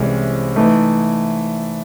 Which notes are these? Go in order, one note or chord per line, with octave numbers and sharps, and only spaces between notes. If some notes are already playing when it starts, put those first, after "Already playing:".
Already playing: C2 C3 E3 G#3 C#4
E3 A3 D#4